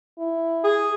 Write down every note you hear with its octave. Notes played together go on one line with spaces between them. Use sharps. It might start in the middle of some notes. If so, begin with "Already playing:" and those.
E4
G#4